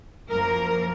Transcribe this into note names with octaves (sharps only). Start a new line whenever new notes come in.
F#2 F3 A#3 A#4